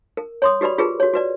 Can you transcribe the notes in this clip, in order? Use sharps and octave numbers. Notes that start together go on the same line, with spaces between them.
A#4
C#5 C6 D#6
F#4 G4 B4 D5 B5
F4 G4 G#4 A#4 B4
F#4 C#5
F#4 B4 D5